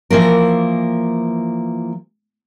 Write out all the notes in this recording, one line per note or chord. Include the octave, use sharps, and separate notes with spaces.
E3 F3 A#3 A#4